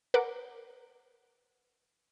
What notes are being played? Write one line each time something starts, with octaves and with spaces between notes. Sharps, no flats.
A#4 B4 F#5 D6